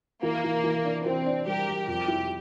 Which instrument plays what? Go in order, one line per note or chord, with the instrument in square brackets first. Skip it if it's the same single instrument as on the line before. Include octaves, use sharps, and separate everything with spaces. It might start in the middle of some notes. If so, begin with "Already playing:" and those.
[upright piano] E3 [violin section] A#3
[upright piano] E3
E3
D4
[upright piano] E3 [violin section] C4
[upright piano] D4
[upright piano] G3 [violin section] G4 A#4
[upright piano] G3
[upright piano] F2 [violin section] G4
[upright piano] E4